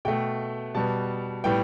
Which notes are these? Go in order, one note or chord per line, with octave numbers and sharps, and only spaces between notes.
B2 A3 G5
B2 G3 B3 A5
A2 G3 B3 G5